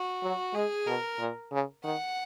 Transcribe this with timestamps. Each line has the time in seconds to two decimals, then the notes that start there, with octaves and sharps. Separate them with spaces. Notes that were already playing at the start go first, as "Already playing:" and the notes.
Already playing: F#4
0.23 F#3
0.54 G#3 G#4
0.86 B2 A#4
1.19 A#2
1.52 C#3
1.84 D#3 F#5